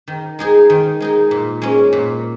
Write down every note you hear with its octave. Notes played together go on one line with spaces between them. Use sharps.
D#3
G#3 D#4 G#4
D#3
G#3 D#4 G#4
A#2
G#3 C#4
A#2